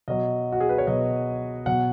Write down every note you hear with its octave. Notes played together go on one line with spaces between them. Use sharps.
B2 F#3 D#5
F#4
G#4
B4
C#5
B2 F#3 D#5
B2 F#3 F#5